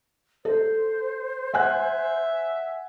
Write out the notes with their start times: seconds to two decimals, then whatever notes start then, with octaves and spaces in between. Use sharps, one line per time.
0.45 A4 C5
1.54 E5 F#5 G#5 F#6